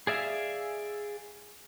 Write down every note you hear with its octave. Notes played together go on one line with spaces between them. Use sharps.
G#4 D5 E5 F5 G#5